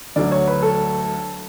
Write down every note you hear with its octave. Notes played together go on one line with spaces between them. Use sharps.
D2 D3 F#3 D5
C#5
B4
A4